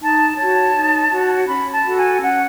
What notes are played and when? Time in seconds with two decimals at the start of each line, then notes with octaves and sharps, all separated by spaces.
0.01 D#4 A5
0.37 F#4 C#5 A5
0.75 D#4
1.11 F#4 C#5
1.47 C#4 B5
1.72 A5
1.85 F#4 A4
1.96 G#5
2.21 C#4 F#5